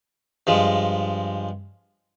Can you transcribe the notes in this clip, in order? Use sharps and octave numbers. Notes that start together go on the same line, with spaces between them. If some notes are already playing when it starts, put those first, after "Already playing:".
G2 F3 G#3